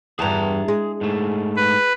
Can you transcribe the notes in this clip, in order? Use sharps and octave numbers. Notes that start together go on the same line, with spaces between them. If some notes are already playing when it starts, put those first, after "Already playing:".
E2 G2 G#4 A5 A#5
G#3
G#2 A3
B4